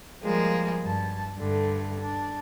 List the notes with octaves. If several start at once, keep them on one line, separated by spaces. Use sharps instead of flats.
F3 G3 G#3 A#3 G#4
G2 A5
G2 D3 A3
D4